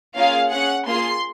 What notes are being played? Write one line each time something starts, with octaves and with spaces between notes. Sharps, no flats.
A#3 C#4 F4 G#4 F5
C#4 G#4 F#5
A#3 F4 G#4 C6